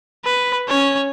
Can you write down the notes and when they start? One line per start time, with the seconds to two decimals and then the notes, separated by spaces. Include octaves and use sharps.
0.24 B4
0.69 C#4 C#5